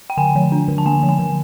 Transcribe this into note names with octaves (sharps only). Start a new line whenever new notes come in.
G5
D3 G#5
F3
D4
D3
A5
A#3 G#5
F3
G#5
D3